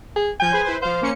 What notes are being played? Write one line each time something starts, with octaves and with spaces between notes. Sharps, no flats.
G#4
F3 G#5 G6
G#4 B4 C5
E4 B4 C5
F3 C5 F5
A#3 C#4 C#7